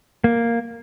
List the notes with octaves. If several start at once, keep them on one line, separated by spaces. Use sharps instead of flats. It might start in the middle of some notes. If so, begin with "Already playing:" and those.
A#3